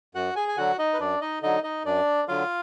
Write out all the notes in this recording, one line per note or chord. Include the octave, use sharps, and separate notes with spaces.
F#2 F#4 F#5
G#4 G#5
G#5
D3 F#3 F#4 F#5
D#4 D#5
B4
F#2 D4 D5
D#4 D#5
D3 F#3 D#4 D#5
D#4 D#5
F#2 D4 D5
D3 F#3 F4 F5